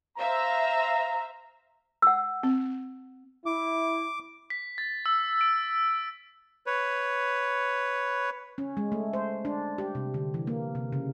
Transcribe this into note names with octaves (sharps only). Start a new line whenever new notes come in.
C5 E5 F5 A#5
F#5 E6
C4
E4 D6
B6
A6
E6
D7
B4 C#5
C#4
G#3
A3
C5
D4
G4
C3
D3
E3
A#3
C3
C#3